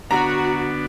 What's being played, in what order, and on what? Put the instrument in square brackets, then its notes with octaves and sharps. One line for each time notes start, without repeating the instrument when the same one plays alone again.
[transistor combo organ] D3 B3 D4 [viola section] F#4 [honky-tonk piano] A#5